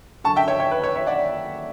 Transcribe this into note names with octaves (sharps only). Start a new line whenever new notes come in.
F#2 D3 A5 C#6
E5 G5
C#5 E5
C#5
B4
C#5
C#5 E5
D5 F#5